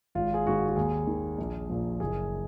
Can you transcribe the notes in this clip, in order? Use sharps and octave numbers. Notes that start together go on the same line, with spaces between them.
G#1 F4
G#4
G#2 D#3 F#4
F#4
D#2 G#4
D#3
A#1
A#2 F3
F#1 G#4